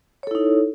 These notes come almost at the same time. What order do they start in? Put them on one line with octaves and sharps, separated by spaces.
C#5 A4 E4 D#4